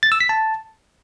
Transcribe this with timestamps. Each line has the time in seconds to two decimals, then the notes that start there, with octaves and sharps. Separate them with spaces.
0.03 A6
0.12 E6
0.20 B6
0.29 A5